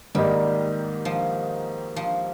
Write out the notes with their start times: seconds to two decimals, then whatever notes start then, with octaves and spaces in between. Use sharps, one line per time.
0.15 G#2 D#3 G3 A#3 D#4 G4
1.05 F3
1.96 F3